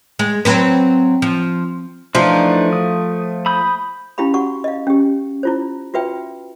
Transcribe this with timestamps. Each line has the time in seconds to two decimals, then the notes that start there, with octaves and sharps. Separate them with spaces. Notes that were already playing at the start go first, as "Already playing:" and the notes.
0.19 G#3
0.45 F#3 C4 B4
1.22 F3
2.15 E3 F3 A3 D4 D#4
2.73 D#6
3.46 B5 D#6 G6
4.18 C#4 E4 G4 F5 B5
4.34 F#4 F#5 C#6
4.64 D#5 F5
4.87 C#4 G4
5.43 E4 F4 C5
5.94 F4 F#4 B4 E5 G5